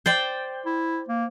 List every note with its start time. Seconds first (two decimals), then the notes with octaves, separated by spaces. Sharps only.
0.06 C5 D5 G5
0.66 E4
1.08 A#3